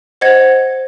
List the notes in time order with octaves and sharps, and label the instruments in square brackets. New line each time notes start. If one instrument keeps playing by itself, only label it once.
[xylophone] C5 D#5 F#5 G#6